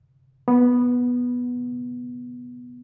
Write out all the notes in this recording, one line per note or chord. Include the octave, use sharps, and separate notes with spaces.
B3